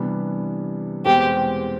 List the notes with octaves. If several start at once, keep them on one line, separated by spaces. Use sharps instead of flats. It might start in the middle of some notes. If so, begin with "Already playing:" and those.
Already playing: C3 E3 G3 B3 D4
E2 B2 G#3 C4 G4